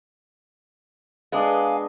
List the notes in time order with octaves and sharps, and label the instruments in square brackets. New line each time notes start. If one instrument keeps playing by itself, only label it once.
[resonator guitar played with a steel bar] G#3 [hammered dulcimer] B3 D4 [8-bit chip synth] F5 G#5